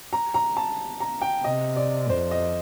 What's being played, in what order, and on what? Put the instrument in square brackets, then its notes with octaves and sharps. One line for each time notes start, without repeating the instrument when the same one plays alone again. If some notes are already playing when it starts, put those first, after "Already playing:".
[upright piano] A#5
A#5
A5
A#5
G5
[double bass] C3 [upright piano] D#5
[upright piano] D5
[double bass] F2 [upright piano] C5
[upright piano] D#5